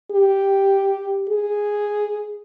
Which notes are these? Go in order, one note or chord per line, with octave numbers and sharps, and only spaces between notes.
G4
G#4